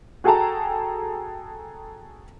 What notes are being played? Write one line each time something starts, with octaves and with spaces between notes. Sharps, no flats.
F#4 G#4 A4 G5 A5 A#5